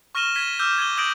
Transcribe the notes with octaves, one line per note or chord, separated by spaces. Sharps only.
C#6 F6 A#6 D#7 E7 G7
G#6 B6 D#7 G7
D6 E6 F6 G6 E7
G#6 D#7 G7
D#6 G6 G#6 A#6 D7 F#7